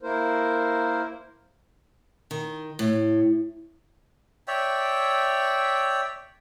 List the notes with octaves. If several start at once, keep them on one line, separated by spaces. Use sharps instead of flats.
A#3 E4 A#4 C5
D#3
A2
C#5 D5 E5 G5